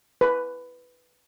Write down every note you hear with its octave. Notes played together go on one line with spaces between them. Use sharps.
B4